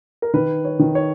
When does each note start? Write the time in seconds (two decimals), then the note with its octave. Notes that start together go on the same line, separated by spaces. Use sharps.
0.22 A#4
0.34 D#3 B4
0.65 C#5
0.79 D#3
0.95 C#5